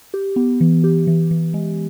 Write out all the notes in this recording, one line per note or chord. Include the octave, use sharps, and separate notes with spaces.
G4
B3
E3
G4
E3
E3
G#3